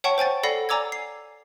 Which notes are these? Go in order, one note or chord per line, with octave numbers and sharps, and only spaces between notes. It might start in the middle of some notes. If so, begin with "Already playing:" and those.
C#5 F#5 G5 A5 C#6
C5 G5 G#5 A6
A4 D5 F#5 B5 A#6 C7
D5 G#5 A#5 D6 E6 G#6
C7